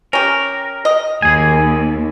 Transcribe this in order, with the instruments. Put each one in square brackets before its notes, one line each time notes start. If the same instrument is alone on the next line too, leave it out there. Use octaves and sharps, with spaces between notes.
[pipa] C#4 G4 [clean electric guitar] A#4
[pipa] D#5
[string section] D#2 [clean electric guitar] G#4 G#5